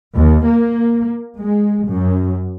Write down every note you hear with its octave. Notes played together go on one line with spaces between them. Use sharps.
D#2
A#3
G#3
F#2